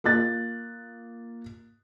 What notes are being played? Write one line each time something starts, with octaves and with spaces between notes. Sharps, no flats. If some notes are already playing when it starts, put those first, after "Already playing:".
A#3 F4 F#6 A6